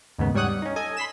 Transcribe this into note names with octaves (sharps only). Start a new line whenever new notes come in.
D#2 G#2 C#3 B3
G#2 G3 C#5 F#5 D#6 F#6
G3
C#4 D#4
A4 D#5 G#5
B5 C6 B6 E7